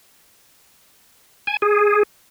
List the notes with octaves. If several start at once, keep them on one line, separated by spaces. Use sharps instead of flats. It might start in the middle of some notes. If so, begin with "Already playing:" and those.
G#5
G#4